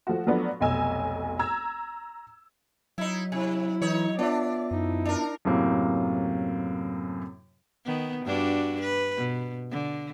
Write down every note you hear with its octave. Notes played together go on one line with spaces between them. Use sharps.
F3 A3 F#4
F3 F#3 A3 B3 D4
F1 B1 D#5 G#5 E6
A#5 E6 G#6
F#3 D#4 E4
C3 E4
E3 D#4 C#5
B3 D4 F4 D5 E5
F#2 D#4 E4
D4 A#4
F#2 A2 C3 A#3
D#3 B3
G2 D4 F#4
B4
B2
D3